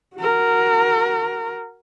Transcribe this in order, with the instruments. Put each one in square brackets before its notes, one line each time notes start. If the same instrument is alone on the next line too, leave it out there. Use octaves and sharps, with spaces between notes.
[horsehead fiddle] F#4 A#4